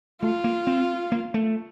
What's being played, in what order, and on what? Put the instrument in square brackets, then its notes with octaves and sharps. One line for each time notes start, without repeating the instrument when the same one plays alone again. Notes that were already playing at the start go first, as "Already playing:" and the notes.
[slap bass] A3 [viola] F4
[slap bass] A#3
C4
A#3
A3